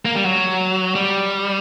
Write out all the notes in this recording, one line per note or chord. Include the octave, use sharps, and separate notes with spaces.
A#3
G3
F#3
G3